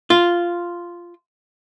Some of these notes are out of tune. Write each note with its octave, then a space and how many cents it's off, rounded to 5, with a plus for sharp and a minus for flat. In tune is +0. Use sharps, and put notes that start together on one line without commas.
F4 -5